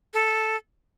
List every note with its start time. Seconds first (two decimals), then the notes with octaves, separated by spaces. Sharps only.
0.14 A4